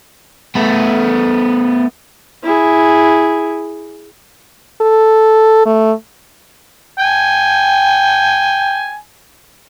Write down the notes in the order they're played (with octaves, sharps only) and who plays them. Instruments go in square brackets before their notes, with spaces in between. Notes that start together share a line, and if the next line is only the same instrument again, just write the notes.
[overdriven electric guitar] A3 B3
[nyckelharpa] E4 G#4
[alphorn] A4
A3
[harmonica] G5 G#5